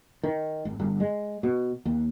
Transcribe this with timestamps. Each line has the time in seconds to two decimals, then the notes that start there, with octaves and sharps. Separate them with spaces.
0.24 D#3
0.65 G#1
0.79 G1
1.00 G#3
1.43 B2
1.85 D#2